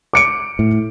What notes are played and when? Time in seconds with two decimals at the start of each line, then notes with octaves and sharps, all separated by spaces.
0.13 D6 C#7 D7
0.59 A2